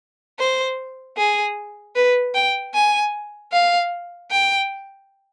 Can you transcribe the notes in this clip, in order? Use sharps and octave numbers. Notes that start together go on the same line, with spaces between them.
C5
G#4
B4
G5
G#5
F5
G5